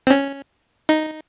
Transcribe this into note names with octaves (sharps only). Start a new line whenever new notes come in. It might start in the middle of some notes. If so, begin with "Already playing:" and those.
C4
C#4
D#4